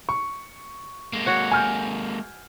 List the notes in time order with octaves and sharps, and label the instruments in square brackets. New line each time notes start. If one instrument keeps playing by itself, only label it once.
[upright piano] C#6
[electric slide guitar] G#3 A#3
[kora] F#4 C#5 F#5
[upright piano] G#5 F6 G6